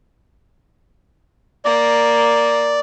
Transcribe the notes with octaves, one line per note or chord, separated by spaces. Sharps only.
A#3 D5